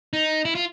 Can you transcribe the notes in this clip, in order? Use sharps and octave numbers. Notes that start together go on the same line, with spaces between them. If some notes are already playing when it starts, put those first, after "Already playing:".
D#4
E4
F4